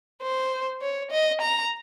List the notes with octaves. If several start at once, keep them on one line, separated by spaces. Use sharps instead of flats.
C5
C#5
D#5
A#5